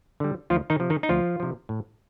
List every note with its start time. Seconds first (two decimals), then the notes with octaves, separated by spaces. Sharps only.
0.20 D3 G3
0.50 D2 F3 F4
0.70 D#3 D#4
0.80 C3 F3
0.90 D#3 D#4
1.03 D#4
1.09 D2 F3 F4
1.40 C3 F3
1.69 A2